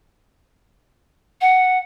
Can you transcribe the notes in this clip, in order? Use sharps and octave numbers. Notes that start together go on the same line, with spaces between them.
F#5